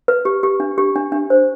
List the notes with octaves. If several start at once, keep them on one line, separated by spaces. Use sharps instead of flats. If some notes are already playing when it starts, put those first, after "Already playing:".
B4
G4
G4
D4
G4
D4
D4
C5